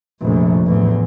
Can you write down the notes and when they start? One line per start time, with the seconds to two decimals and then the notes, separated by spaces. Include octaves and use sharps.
0.20 F1 A#1
0.66 A1 E2